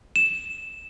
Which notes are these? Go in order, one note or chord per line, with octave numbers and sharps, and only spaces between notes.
E7